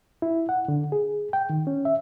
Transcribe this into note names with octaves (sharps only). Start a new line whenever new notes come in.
E4
F#5
D3
G#4
G5
D#3
C#4
E5